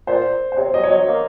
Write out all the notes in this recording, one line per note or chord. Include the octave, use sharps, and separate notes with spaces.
A#2 C5
C5
C3 C#5
F#3 D#5
C#5
F#3 D#5
A#3